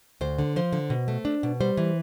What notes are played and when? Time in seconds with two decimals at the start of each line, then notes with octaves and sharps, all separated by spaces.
0.21 D2 C5
0.39 D3
0.56 F3 C5
0.73 D3
0.90 B2
1.08 A3
1.25 D4
1.43 B2
1.61 G3 C5
1.77 E3